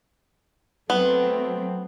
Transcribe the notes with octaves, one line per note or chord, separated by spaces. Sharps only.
F#3 A3 B3 C4